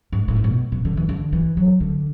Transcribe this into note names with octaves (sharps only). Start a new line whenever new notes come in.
G#2
A2
B2
B2
D3
E3
D3
E3
F#3
D3